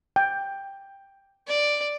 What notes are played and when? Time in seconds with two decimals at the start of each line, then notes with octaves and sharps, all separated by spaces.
0.16 G5
1.48 D5